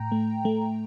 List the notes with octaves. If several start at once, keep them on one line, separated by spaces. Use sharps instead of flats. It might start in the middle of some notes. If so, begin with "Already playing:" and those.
Already playing: A2 G5 A#5
A3
A3